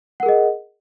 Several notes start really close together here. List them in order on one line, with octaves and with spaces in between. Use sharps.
F#5 A#4 G#4 D#5